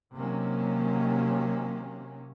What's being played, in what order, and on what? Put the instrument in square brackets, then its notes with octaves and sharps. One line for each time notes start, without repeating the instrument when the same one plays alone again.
[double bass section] C3 D#3 F#3 A#3 C#4